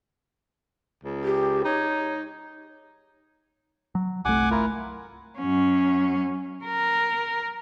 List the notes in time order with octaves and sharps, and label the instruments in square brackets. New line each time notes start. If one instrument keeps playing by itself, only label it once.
[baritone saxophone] C#2
[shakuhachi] G4
[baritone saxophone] D#4 [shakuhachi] C#5
[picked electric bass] F#3
[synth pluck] G1 A3 [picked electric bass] C2 [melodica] F#5 G#5 D6
[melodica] E4 F4 A#4
[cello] F#2 C#4
A#4